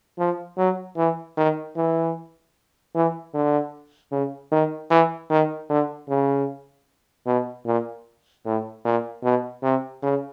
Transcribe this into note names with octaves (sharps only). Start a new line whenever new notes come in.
F3
F#3
E3
D#3
E3
E3
D3
C#3
D#3
E3
D#3
D3
C#3
B2
A#2
A2
A#2
B2
C3
C#3